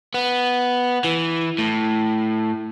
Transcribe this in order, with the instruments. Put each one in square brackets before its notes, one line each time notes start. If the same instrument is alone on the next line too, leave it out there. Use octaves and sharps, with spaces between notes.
[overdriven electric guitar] B3
E3
A2